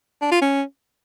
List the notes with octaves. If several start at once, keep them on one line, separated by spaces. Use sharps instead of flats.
D4
F4
C#4